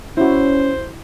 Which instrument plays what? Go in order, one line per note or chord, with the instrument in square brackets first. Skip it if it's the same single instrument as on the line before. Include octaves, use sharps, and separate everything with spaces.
[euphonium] C#4 [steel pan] E4 F#4 [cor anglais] C5